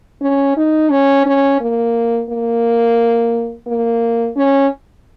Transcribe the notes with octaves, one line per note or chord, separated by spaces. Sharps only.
C#4
D#4
C#4
C#4
A#3
A#3
A#3
C#4